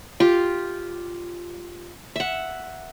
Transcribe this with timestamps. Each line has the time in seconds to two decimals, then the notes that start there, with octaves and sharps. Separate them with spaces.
0.20 F4 G4
2.16 E5 F#5